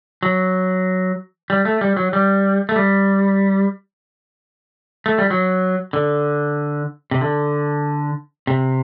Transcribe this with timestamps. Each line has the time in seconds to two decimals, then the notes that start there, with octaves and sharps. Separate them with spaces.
0.23 F#3
1.50 G3
1.65 A3
1.81 G3
1.96 F#3
2.13 G3
2.69 A3
2.76 G3
5.06 A3
5.18 G3
5.30 F#3
5.93 D3
7.11 C3
7.21 D3
8.47 C3